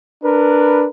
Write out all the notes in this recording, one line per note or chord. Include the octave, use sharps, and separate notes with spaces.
D4 A#4 B4